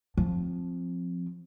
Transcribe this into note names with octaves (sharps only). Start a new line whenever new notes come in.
F3 C4